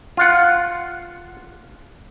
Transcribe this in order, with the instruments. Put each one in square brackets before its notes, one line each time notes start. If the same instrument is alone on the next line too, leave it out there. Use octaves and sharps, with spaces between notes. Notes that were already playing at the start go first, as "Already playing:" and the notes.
[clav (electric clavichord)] F4 F5 F#5